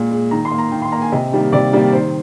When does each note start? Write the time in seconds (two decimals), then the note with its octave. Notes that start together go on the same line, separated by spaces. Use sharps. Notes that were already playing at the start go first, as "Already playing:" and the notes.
Already playing: A#2 G#3
0.11 G#3
0.31 D#3 A#5
0.45 C6
0.51 A#3
0.58 A#5
0.72 D#3 G5
0.82 C6
0.92 A#3 A#5
1.02 G#5
1.12 C3 D#5
1.32 D#3 G3 A#3
1.52 C3 D5
1.73 D#3 G3 A#3
1.93 D#3 C5